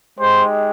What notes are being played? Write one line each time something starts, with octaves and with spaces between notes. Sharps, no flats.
G#3 D#4 G4 C5